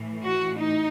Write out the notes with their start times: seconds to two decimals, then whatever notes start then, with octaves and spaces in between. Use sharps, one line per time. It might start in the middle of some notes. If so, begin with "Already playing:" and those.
Already playing: A2 E3
0.25 F#4
0.58 D#4